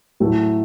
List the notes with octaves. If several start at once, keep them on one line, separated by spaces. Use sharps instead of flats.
A2 F#3 A3